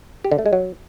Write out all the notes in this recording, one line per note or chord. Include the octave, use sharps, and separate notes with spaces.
G4
D3
A3
G#3
F#3